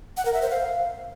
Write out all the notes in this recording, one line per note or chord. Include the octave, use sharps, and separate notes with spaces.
F#5
A#4
E5
C5
F5